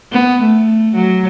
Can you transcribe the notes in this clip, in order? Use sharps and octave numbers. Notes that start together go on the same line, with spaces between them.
B3
A3
F#3